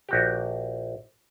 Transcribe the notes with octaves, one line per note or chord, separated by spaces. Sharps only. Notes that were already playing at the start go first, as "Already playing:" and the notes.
A#1 F#4 G4